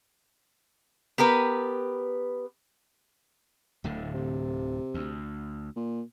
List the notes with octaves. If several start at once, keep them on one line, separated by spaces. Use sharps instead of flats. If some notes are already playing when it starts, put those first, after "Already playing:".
B3 G4 A#4 B4
D1 A2 D3
C3
D2
A#2